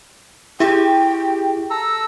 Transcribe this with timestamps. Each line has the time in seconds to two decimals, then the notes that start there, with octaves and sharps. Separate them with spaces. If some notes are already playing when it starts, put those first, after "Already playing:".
0.60 E4 G4 G#4 G5
1.70 A4 A#5 E6